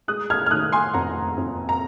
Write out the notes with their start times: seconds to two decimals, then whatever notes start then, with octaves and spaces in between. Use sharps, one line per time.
0.08 G#3 D#6 F#6
0.30 F6 G#6
0.46 F6
0.50 D#3 D#6 F#6
0.72 G#5 C6
0.93 F2 F#5 A#5
1.37 F2
1.69 A#5